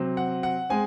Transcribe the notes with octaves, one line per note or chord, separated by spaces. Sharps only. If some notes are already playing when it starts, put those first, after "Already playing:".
Already playing: C3 F#3 C4
F#5
F#5
G#3 C4 G#5